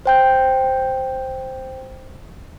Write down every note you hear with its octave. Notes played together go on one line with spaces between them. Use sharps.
C5 G5 G6